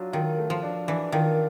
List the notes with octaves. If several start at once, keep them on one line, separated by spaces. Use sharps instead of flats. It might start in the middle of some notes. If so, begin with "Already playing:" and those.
Already playing: F#3 D4 F4
D#3 F4
A3
F3
D4
E3 D4
D#3 F4